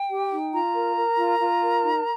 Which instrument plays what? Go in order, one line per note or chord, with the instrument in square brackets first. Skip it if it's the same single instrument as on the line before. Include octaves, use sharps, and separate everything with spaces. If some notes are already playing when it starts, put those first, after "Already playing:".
Already playing: [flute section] G5
G4
D#4
F4 A#5
A#4
A#4
F4
F4
A#4
D#4